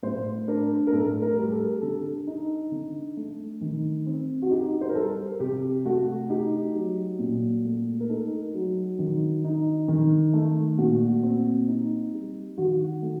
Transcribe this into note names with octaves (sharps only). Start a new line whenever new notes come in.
A2 C5
D4 A#4
A#4
A2 A4
A#4
G3 G4
A4
D3 A4
D#4
D3
A3
D#3
C4
F#4
D#4 G4
C5
A#4
G3 A4
C3 G4
A3 F#4
D#4 G4
F#3
A#2
A3
A#4
D#4 A4
F#3
D#3
D#4
D#3
A3
A#2 F#4
C4
D#4
G3
D#3 F#4
A3